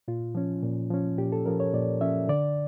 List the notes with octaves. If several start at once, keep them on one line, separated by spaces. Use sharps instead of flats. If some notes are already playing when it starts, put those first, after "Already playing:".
A#2 F4
F3 C#4
A#2
F3 C#4
A#2 G4
A4
F3 C#4 A#4
C#5
A#2 D5
F3 C#4 E5
D3 D5